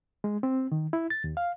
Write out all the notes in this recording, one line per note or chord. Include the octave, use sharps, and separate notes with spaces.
G#3
C4
D#3
E4
A6
D#2
F5